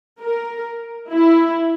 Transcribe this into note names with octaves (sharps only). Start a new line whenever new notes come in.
A#4
E4